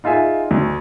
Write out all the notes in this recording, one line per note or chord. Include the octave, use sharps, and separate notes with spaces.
D#4 F4 G#4 E5 G#5
D2